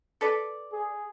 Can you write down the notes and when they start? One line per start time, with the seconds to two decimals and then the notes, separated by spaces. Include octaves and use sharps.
0.21 A4 B4 D5
0.73 G#4